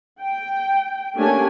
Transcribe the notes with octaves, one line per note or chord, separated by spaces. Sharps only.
G5
A3 A#3 C#4 D4 G4 G#5